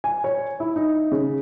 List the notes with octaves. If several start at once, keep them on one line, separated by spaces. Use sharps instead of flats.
G#5
C#5
E4
D#4
C#3